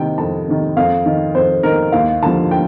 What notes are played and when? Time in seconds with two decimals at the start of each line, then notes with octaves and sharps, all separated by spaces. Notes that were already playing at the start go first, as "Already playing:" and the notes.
Already playing: C3 D#3 G5
0.18 F2 A5
0.48 C3 D#3
0.77 F2 F5
1.06 D#3
1.35 F2 C5
1.63 D#3 A#4
1.92 D#2 F5
2.23 D3 F3 A5
2.51 G5